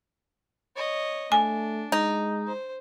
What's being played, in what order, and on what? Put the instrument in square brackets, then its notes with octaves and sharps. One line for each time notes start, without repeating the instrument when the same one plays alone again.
[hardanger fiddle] C#5 D#5
[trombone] A3 [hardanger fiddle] D4 [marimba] G#5
[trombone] G#3 [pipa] D#4
[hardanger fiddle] C5